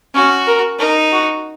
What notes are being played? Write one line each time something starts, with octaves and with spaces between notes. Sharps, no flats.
C#4 F#4
A#4
D#4 A#4
F#4